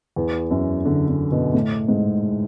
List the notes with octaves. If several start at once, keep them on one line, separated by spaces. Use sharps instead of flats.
E2
F#2
D3
D3
B2
A2
G#2